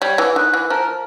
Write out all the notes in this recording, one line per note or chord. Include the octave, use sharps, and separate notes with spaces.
G3 C#5
E3
D#3 B4
E3
F3 A#4